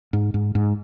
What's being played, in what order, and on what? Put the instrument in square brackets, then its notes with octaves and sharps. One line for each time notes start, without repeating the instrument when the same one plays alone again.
[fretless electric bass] G#2
G#2
G#2